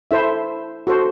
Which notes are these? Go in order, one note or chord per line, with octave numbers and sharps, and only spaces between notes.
E4 A4 C5 E5
F#4 A4 C5